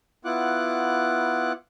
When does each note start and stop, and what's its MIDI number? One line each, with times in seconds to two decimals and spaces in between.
0.25 1.52 59
0.25 1.52 64
0.25 1.52 65
0.25 1.52 78
0.25 1.52 86
0.25 1.52 90